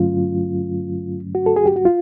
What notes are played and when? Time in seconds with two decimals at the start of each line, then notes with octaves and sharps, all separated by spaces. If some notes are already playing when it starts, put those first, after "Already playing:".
Already playing: G2 D3 F#3 A3 C#4 F4
1.35 F#4
1.46 A4
1.56 G#4
1.66 G4
1.76 F#4
1.85 F4